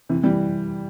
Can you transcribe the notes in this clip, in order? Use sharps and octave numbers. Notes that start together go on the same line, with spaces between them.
C3 E3
E3 G3